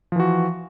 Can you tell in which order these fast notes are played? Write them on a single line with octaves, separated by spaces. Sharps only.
F3 E3 F#4